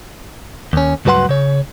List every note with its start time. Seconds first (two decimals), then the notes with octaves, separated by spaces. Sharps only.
0.73 D#2 C#4
1.05 C#2 G2 F#3 B4 F#5 C6
1.29 C#3 C#5